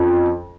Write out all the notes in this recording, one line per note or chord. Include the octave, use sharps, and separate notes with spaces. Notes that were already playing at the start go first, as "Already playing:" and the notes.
Already playing: F2 C#4